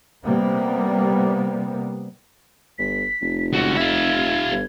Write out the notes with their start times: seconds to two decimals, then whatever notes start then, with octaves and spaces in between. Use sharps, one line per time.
0.24 C3 G3 A#3 B3
2.78 G1 B6
3.22 F1
3.53 C#2 F#4
3.77 F4 E5 G#6
4.51 G1